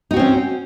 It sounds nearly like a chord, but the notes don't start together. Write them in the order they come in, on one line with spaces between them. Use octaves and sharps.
D#4 F#4 C4 C#4